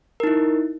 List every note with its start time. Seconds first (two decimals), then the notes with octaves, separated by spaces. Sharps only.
0.20 A#4
0.24 D#4
0.27 E4